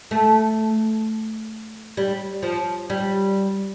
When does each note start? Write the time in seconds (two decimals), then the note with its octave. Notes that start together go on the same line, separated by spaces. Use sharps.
0.11 A3
1.97 G3
2.42 F3
2.90 G3